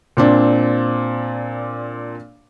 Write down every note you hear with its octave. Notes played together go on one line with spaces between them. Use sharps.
A#2 C4 D4